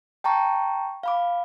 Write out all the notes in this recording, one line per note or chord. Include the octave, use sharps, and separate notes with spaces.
G5 A5 A#5 C#6
F5 B5 D6